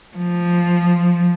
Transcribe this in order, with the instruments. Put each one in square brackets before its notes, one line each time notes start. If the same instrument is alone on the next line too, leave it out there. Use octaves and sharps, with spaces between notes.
[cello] F3